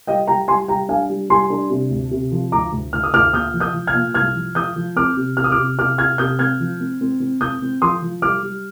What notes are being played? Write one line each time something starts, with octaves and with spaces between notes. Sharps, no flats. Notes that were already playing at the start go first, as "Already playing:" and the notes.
G3 D#5 G5
G3 G5 A#5
G3 G#5 C6
G3 G5 A#5
D4 F5 G#5
G3
G3 G#5 C6
D4
C3
D2
C3
F3
D2 A#5 D6
D2
D2 F6
D#6
D2 D6 F6
A#2 D#6 G6
F3
D#6 G6
F3
F6 G#6
A#2
C2 F6 G#6
F3
F3 D#6 G6
F3
C4 D6 F6
C3
C3 F6
D#6
D6 F6
C3
C3 D6 F6
C3 F6 G#6
C3 D#6 G6
C4 F6 G#6
F3
C4
C4
C4
C4 D#6 G6
C4
F3 C6 D#6
F3
G3 D6 F6
G3